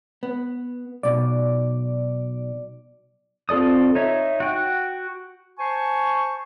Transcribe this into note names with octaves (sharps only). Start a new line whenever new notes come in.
B3
B1 B2 D5
C4 F4 A4 D5 D#6
D#4 C#5 E5
F#4 G5
C5 G#5 A5 C#6